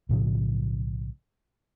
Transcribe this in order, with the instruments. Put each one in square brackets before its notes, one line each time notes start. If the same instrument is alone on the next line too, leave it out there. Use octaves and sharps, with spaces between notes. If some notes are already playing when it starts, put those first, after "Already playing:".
[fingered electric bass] B1 A2 C#3 F3